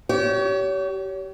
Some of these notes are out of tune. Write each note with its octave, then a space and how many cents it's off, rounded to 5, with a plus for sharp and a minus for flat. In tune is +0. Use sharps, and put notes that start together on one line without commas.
G4 -30 C#5 +30